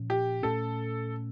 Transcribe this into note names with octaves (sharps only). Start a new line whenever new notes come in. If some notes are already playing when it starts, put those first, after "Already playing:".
Already playing: A#2 F3 C#4
G4
A#2 A3 C#4 A4